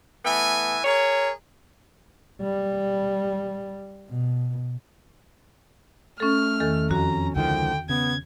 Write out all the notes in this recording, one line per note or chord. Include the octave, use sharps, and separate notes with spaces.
E3 A3 B3 E5 G#5
G#4 A#4 C#5
G3
B2
A3 C#4 A4 F6
E2 D#3 A4
F2 C#4 F#4 A#5
C#2 D3 D#3 F3 G5
C#3 B3 G#6